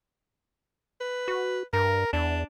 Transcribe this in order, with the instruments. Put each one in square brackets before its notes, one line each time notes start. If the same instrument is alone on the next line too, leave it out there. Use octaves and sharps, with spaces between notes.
[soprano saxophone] B4
[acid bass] F#4
[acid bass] G2 [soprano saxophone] A#4
[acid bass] E2 [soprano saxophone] D4